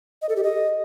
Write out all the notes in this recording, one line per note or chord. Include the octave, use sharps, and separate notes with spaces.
D#5
A4
G4
D#5